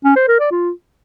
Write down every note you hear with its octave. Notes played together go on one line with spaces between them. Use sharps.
C#4
C5
A#4
D5
F4